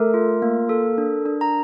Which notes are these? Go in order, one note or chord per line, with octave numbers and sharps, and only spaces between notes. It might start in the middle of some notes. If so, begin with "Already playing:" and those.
Already playing: A3 A4 A#4
F4
A#3
A4
D4
D4
A#5